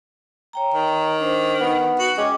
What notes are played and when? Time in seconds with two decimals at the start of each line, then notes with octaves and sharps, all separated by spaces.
0.53 C#5 G5 A#5
0.74 D#3
1.20 D4 C5
1.61 B3 D#4
1.99 F#4
2.18 G#3 C#4 G5 D6